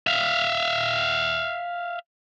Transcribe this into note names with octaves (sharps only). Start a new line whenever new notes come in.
E5 F5